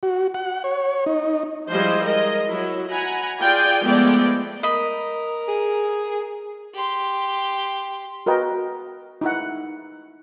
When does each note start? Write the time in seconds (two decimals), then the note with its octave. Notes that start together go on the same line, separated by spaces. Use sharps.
0.03 F#4
0.34 F#5
0.64 C#5
1.06 D#4
1.70 F3 G3 G#3 E4 C5 D#5
2.03 G#3 A#4 D#5
2.49 F#3 E4
2.89 F#5 G#5 A#5 B5
3.40 F4 G#4 D5 G5 G#5
3.84 F3 G#3 A3 B3 D5 G5
4.63 A#4 D#5 B5
5.48 G#4
6.74 G4 C6
8.26 F#4 A#4 B4 D#5 G5
9.21 D#4 E4 F#5